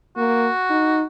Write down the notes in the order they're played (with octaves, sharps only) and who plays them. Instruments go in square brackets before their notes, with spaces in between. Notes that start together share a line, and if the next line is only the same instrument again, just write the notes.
[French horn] A#3 [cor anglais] F#4
[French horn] D#4